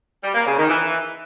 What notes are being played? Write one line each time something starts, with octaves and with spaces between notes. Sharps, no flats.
G3
A#3
C#3
D#3
E3